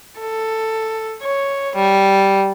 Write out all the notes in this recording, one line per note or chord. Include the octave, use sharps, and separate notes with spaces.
A4
C#5
G3